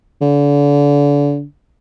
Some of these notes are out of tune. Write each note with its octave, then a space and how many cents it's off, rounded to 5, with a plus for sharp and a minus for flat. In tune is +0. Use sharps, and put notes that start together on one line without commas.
D3 -35